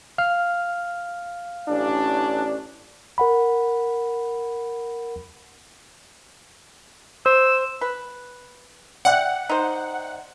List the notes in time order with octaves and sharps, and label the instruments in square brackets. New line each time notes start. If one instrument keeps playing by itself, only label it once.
[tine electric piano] F5 F6
[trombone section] A1 C#4 D4
[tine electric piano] A#4 F#5 B5
[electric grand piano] C5 [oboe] E6
[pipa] B4
[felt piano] D5 E5 G5 [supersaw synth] F#5
[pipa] D#4 C5